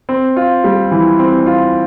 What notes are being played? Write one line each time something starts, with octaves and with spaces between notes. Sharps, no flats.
C4
F4
G3
E3
C4
F4